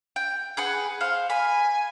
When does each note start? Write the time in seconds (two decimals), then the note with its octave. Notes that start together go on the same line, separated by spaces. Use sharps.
0.16 G5
0.57 G#4 B4 F#5
1.01 C5 F5
1.30 G#5 B5